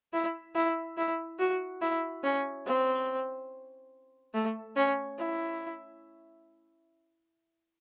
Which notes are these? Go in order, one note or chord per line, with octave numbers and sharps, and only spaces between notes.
E4
E4
E4
F#4
E4
C#4
C4
A3
C#4
E4